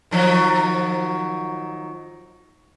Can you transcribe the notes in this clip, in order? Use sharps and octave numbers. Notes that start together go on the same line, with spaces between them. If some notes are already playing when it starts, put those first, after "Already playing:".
D#3 F3 F#3